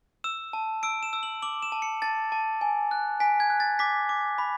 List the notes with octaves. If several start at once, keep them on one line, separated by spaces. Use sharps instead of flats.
E6 E7
A5
E6 D7
E7
E6
F#7
D6 F#7
E7
A5
C#7
A5 A6
A5
G#5
F#6
G#5 B6
G#6
F#6
A6
D6 B6
D6
B5